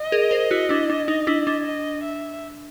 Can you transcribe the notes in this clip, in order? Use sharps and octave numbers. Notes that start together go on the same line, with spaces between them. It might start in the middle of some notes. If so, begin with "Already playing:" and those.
Already playing: D#5
G#4 A#4
A#4 C5
E4 F#4
D4 E4
D4
D#4
D4 E4
D4
D#5
E5